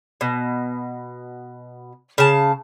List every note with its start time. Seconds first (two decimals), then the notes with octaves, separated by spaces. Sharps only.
0.21 B2
2.18 C#3 A5